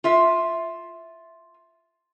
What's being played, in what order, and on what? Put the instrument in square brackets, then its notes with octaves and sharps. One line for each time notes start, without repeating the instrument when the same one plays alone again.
[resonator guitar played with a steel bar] F4 E5